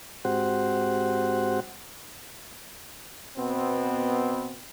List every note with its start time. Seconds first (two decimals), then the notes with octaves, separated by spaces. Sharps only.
0.25 G#2 C4 F#4 G4 C5 F#5
3.37 B2 B3 C4